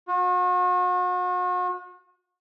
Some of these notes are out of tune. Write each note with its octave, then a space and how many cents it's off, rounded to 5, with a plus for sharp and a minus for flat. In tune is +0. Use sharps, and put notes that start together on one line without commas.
F#4 -40